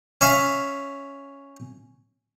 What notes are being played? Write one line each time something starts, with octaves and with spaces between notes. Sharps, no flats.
C#4 E5 F5